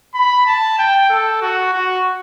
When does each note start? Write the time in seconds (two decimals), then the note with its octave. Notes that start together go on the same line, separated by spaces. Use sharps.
0.15 B5
0.46 A5
0.78 G5
1.10 A4
1.42 F#4
1.73 F#4